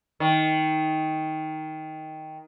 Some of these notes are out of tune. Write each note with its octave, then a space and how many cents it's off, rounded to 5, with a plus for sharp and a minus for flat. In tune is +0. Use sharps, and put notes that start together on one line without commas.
D#3 +10